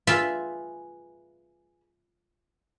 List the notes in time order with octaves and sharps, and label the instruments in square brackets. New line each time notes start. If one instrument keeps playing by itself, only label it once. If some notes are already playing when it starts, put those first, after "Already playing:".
[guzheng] F4 E5 [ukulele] G#4 B4